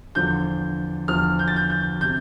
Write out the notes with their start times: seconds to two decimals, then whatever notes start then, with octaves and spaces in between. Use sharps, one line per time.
0.15 E2 D3 F3 G6
1.08 E2 D3 F3 F6
1.39 G6
1.48 A6
1.56 G6
1.70 G6
2.01 C3 G6